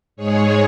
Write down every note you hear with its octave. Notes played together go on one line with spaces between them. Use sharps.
G#2 G#3 G#4 C#5